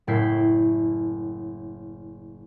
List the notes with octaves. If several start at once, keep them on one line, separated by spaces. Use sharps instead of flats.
F#1 A2 E4 G6 B6 C7